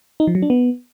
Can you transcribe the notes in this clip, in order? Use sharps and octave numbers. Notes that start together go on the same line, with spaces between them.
D#4
F3
F#3
D4
B3